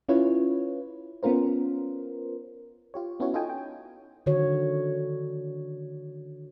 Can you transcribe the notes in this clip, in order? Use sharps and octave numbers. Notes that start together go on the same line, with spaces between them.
C#4 E4 F4 B4 C#5
B3 C#4 F4 A#4 C5
F4 G4 C#5
B3 C#4 E4 F#4 C#5
D#4 F4 A4 D#5 G5 G#5
G5
D3 D#3 F#4 C#5